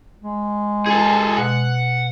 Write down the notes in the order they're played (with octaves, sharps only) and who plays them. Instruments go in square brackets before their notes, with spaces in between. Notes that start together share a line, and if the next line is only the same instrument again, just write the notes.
[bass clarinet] G#3
[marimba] C#4 [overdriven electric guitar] G#4 A4
[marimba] B2 [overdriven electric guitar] F#5